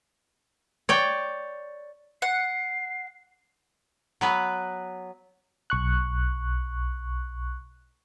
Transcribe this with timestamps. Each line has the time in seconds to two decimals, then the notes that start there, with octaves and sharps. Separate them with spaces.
0.89 C#5 D5 G5
2.22 F#5 C7
4.21 F#3 B3 B4
5.70 B1 C#6 F#6